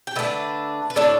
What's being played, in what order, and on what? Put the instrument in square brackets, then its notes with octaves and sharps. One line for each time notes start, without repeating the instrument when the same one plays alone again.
[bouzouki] G5
D3 A3 D4 B4 E5
B4
A2 A3 D4 A4 D5